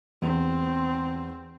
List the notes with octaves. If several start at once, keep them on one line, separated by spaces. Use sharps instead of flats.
E2 C4